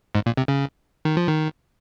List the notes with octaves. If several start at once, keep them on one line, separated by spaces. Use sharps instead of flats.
G#2
A#2
C3
C#3
D#3
F3
D#3